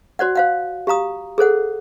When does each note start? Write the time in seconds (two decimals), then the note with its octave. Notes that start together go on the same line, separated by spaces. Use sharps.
0.19 F#4 C5 D5 F#5
0.36 C5 F5 F#5
0.87 G4 F5 A#5 D#6
1.38 G#4 A4 C5 F#5